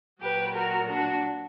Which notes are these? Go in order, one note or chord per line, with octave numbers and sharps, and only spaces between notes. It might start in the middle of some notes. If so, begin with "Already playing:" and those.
A#2 F#3 G4 B4
F#4 A#4
D4 F#4